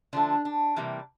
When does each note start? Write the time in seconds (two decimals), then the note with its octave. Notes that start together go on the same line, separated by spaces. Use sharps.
0.13 D3 F3 A3 D4
0.45 D4
0.76 C3 E3 G3 A#3